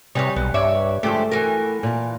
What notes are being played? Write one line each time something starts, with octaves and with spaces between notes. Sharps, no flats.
C3 G3 D#4 B4 C#5 G#5
B1 B3
G2 C#5 D5 E5
D3 F3 G#3 A3 G4 C5
E3 F#4 A#4 G#5
A#2 A5